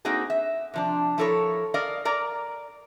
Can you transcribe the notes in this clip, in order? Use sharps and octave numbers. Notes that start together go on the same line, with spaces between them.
A#3 C4 D#4 F#4 G#4
E5
C3 F3 D4
F3 E4 A4 A#4 C#5
A#4 D5 D#5 F5
A#4 D5 A#5